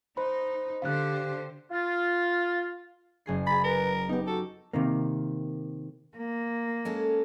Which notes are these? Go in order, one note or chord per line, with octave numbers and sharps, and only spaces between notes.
D#4 C5 B5
D3 G4 C5 F5 F#6
F4
F#1 G#4 C7
G#4 B5 A6
A#4 B4
B3 D#4 G4
F#4 A4
C3 D#3 A#3
A#3
G#3 C#4 A4